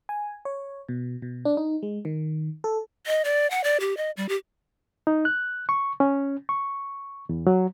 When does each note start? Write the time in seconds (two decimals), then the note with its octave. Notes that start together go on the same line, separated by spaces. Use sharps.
0.09 G#5
0.45 C#5
0.89 B2
1.22 B2
1.45 D4
1.57 D#4
1.83 G#3
2.05 D#3
2.64 A4
3.07 D#5
3.25 D5
3.51 F#5
3.64 D5
3.80 G4
3.97 D#5
4.17 G3
4.29 G4
5.07 D#4
5.25 F#6
5.69 C#6
6.00 C#4
6.49 C#6
7.29 E2
7.47 F#3